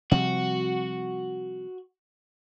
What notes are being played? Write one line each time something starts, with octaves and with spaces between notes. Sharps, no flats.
C3 F3 G3 F#4